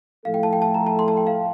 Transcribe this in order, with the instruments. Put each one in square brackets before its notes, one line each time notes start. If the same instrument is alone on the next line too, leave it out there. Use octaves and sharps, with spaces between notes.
[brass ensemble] A2 F3 A3 E4 A4 [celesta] F5
[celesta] G5
A5
G5
A5
A#5
A5
C6
A5
G5
F5